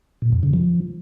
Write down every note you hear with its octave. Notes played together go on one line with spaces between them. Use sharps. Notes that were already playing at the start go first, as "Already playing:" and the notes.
A#2
F2
C#3
F3